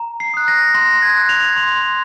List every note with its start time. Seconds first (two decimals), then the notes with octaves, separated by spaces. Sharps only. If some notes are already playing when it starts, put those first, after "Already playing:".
Already playing: A#5
0.20 C7
0.34 D#6 F#6
0.48 A#6
0.75 C6 A#6
1.02 G#6
1.17 F#6
1.29 F7
1.56 C6 F7